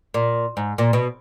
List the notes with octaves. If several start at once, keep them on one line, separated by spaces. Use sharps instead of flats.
A#2
G#2
A#2
B2